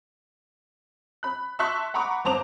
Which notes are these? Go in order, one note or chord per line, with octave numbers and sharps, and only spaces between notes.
B5 F#6
E5 A5 C6 C#6 F#6 B6
F#5 A#5 B5 C#6 D6
G1 C5 A5 A#5 D6 F7